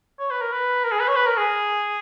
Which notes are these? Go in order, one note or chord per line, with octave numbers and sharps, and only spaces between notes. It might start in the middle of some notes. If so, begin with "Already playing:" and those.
C#5
B4
A#4
B4
A#4
G#4
B4
C#5
B4
A#4
G#4